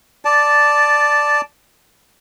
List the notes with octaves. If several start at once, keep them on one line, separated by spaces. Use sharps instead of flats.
D5 A5